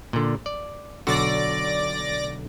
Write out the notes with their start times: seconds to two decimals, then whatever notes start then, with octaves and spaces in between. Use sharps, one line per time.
0.13 A#2 D3
0.46 D5
1.07 B1 D3 F#4 D5 D6 A#6